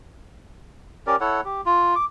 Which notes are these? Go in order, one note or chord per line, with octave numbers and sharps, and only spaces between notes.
C#4 G4 A#4 D5
E4 A4 C#5 F#5
G4
F4
D6